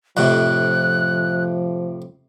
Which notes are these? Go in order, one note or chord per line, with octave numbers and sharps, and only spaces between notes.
F2 A2 C3 F3 F#6